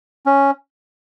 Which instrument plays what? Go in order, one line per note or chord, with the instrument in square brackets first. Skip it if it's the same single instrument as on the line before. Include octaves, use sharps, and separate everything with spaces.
[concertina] C#4